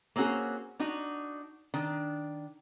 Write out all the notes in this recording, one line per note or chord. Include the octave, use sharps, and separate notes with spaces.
A#3 C4 C#4 F#4 G#4
D4 D#4 F#4
D#3 D4